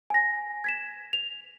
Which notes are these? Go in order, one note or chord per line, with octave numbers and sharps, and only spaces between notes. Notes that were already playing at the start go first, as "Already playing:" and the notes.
G#5 A#6
G#6 B6 E7
F7